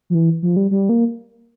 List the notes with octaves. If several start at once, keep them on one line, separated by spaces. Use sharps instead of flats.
F3
E3
F3
G3
G3
A#3